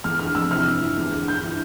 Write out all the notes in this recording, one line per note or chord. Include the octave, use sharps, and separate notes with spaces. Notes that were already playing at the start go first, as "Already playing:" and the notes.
E2 F6
D3 F6
F2 E6
C3 E3 F6
G2
E3
E2
D3
G2 G6
E3